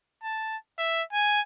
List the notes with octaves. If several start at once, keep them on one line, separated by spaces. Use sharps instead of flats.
A5
E5
G#5